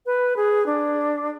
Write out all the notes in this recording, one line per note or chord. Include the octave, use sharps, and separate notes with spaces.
B4
G#4
D4